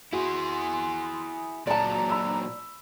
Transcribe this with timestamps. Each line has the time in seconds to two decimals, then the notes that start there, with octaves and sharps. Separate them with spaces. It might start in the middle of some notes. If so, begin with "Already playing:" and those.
0.13 E4 F#4 G#4 C6
1.67 A#2 F#3 D4 D5 A5 A#5
2.10 B5 E6